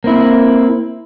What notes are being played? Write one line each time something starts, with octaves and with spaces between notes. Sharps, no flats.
A#3 C4 E4